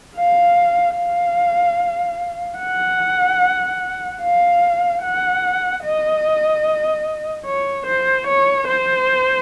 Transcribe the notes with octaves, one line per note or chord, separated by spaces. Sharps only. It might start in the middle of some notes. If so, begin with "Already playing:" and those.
F5
F5
F#5
F5
F#5
D#5
C#5
C5
C#5
C5